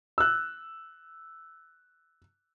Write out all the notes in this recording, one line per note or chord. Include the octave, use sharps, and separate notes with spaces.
E6 F#6